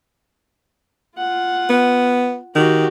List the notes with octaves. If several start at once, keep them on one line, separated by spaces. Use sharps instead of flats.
F4 F#5
B3
D#3 F#4 G4